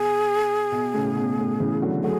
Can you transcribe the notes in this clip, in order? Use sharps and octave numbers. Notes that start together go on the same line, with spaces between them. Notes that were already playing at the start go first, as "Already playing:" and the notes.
Already playing: B2 G#4
B2
A2 C#3
B2
A2
C#3 E3
D3 F#3
F#3 A3 G#4